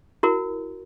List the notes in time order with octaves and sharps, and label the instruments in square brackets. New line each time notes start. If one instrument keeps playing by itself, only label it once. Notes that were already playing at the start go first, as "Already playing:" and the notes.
[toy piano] E4 F#4 A#4